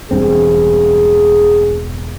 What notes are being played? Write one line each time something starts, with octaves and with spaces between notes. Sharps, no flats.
E1 G2 C4 G#4